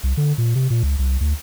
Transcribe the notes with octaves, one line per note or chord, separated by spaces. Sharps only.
C2
D3
A#2
C3
A#2
C#2
C2
D2